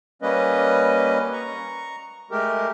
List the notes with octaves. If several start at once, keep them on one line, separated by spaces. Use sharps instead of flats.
G3 A#3 C#4 B4 D#5
A#5 C#6
G#3 A3 G4 A#4